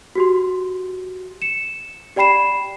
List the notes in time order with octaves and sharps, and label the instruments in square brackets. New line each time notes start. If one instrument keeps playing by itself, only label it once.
[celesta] F#4 G4 C6
C#7 E7
G4 D5 G5 B5 C7 E7